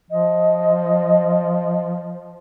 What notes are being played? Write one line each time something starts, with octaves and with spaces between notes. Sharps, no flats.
F3 D#5